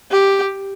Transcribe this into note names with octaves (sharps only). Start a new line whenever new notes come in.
G4